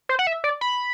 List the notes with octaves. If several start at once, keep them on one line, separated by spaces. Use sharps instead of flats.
C5
F#5
E5
D5
B5